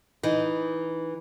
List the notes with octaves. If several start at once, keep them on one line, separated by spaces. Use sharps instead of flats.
E3 D#4